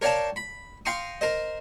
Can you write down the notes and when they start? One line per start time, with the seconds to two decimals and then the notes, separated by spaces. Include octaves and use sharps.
0.02 A#4 C#5 D5 F5 G5 A5
0.36 B5
0.85 F5 G5 A#5 C6 C#6 D#6
1.21 A#4 C5 D#5